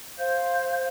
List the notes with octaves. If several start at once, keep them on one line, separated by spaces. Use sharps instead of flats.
C5 F5 G6